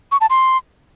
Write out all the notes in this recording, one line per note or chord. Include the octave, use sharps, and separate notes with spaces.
C#6
A5
C6